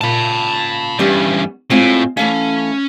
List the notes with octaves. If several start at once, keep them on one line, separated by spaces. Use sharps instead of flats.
A#2 C#3 F4 A5 B5
E2 G2 G3 B3 C#4
A2 G#3 C4 F4
E3 A3 C#4 F5